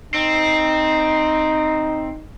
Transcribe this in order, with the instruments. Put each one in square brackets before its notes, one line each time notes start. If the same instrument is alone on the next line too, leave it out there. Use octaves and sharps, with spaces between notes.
[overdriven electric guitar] C4 [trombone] D#4